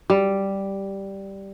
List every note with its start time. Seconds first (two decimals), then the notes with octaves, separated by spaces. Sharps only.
0.10 G3